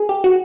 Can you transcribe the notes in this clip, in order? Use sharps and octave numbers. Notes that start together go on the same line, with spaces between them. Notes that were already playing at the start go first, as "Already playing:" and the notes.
Already playing: G#4
G4
F#4